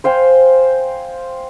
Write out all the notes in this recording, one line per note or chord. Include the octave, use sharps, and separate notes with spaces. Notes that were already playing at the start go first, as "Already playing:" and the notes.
C5 F5 G5 G#5